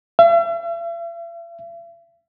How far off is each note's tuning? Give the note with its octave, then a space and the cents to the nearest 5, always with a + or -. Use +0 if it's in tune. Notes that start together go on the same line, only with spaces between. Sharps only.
E5 +45